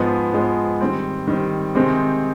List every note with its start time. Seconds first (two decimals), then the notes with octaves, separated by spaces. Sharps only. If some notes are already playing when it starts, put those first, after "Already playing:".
Already playing: G#2 F3 G#3 B3
0.33 G#2 F3 G#3 B3
0.81 D#3 G3 C4
1.27 D#3 G3 C4
1.75 C3 D#3 G#3 C4 D#4